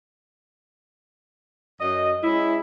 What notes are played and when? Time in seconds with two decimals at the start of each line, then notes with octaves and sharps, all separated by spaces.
1.81 F#2 D#5
2.23 G#3 C#4 E4